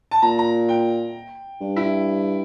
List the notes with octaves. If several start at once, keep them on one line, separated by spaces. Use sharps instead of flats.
A5
A#2 A#5
A#5
G5
G2
E4